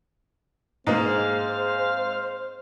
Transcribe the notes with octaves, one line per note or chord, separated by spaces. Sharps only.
G#2 G#3 A#3 C4 G#4 C5 F5